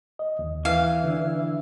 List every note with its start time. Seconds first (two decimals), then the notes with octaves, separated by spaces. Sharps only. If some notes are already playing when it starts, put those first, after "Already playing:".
0.19 D#5
0.39 D#2
0.65 E3 F5
1.04 D3 D4